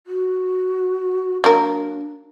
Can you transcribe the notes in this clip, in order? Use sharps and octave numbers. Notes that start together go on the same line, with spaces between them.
F#4
F#3 A#3 D4 A#4